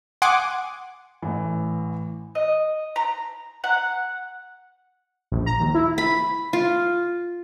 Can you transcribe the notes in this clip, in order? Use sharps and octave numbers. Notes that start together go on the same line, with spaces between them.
F#5 G#5 C6 D6 D#6
A1 E3
D#5
A#5
F#5
A#1
A#5
D#2
E4
B5
F4